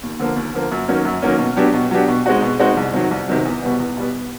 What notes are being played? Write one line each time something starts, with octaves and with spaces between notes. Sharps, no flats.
D#2
D3 F3 A#3
D#2
D3 F3 A#3
F#2
D#3 F#3 A#3 C#4
F#2
D#3 F#3 A#3 C#4
B2
F#3 B3 D4 G4
B2
F#3 B3 D4 G4
B2
G#3 C4 D#4 F#4
B2
G#3 C4 D#4 F#4
C2
C3 D#3 F#3
C2
C3 D#3 F#3
E2
B2 G3 B3
E2
B2 G3 B3